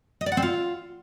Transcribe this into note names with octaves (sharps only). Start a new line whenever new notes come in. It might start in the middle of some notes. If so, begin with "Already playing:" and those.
D#5
D5
F#5
C4
F4